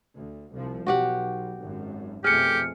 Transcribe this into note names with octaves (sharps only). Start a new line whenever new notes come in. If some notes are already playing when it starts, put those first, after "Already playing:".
D2
C2 F3
B1 F#4 G4 F#5
G#1 F#2
F2 B2 A3 G4 G#4 F6 C#7